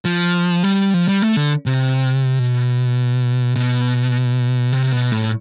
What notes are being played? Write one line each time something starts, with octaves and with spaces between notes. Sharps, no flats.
F3
G3
F3
G3
A3
D3
C3
B2
B2
C3
B2
A2